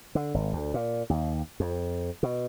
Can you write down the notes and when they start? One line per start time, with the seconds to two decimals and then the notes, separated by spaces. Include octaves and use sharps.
0.15 D3
0.34 G#1
0.53 D2
0.74 A#2
1.10 D#2
1.60 F2
2.23 B2